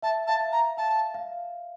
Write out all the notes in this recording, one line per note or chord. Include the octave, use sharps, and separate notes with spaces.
E5 A5
F5 A5
E5
A#5
F5 A5
F5